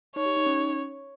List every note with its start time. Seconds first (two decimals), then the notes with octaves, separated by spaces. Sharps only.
0.15 D#4 C#5
0.26 G4
0.37 D#4
0.46 C#4